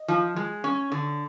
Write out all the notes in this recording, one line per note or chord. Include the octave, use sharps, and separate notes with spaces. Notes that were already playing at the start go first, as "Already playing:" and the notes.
Already playing: D#5
F3
G#3
C#4
D3